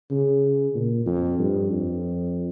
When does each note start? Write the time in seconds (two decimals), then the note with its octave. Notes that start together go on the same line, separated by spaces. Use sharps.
0.11 C#3
0.75 A#2
1.06 F2
1.39 G2
1.70 F2